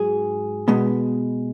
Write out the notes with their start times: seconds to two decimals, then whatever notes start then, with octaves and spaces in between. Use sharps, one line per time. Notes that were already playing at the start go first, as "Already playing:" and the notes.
Already playing: G#2 F#3 G#4
0.68 B2 G#3 B3